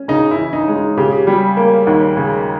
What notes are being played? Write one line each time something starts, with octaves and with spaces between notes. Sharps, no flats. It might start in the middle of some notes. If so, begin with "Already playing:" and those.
Already playing: C#4
C#3 D#4
E4
E3
D#4
G#3
D#4
C#3 G4
G#4
G4
G3
A#3
D#2
C#3